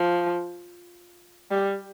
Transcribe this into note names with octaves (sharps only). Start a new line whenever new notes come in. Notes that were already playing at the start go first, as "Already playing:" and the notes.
Already playing: F3
G3